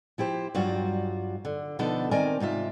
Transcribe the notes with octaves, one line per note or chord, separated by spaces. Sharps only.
F3 E4 G4 C5
G2 F#3 G3 F4 F#4
D3
B2 D3 F3 B3 D#4 A4
D#3 C4 A#4 D5 G#5
G#2 C3 F4 E5